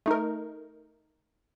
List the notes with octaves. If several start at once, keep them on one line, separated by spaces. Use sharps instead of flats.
A3 D#4 A#4